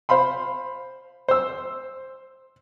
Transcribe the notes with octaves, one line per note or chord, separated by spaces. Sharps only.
C5 F5 B5 C6
C5 E6